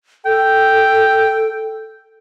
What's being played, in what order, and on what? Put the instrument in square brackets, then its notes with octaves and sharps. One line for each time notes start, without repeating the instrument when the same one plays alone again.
[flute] A4 [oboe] G5